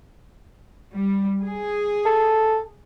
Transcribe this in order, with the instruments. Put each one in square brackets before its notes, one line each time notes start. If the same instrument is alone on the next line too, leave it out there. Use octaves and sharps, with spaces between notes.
[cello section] G3
G#4
[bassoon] A4